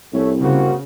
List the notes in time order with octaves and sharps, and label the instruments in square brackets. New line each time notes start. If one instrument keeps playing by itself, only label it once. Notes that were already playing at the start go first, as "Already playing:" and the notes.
[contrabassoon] C2 [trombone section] A3 C#4
[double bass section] C#3 [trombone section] A#3 C4 F#4